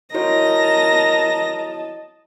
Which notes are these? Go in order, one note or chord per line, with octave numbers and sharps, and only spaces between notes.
E4 F#4 A#4 C#5 D#5 A5 A#5 A#6